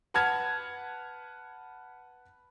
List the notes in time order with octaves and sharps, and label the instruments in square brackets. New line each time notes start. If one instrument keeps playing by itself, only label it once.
[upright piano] B4 F#5 A5 B5 F6 G#6